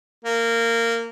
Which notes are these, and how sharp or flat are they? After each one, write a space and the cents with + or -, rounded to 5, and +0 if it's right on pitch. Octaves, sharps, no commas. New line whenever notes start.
A#3 -15